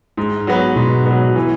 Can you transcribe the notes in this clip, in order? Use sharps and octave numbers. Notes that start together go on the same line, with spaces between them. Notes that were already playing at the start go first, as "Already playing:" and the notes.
G#2
F#3 B3
G#2 B2
F#3 B3
E3